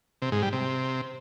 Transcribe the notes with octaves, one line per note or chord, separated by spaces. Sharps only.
C3
G#2
G3
C3